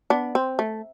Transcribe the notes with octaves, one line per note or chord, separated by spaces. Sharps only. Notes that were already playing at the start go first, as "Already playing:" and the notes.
B3 D4
C4
A3